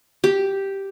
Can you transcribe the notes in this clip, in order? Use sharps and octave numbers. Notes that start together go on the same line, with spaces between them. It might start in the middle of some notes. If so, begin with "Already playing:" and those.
G4